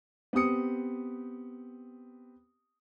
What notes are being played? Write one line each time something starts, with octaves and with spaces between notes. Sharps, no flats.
B3 C4 G4 D#6 C#7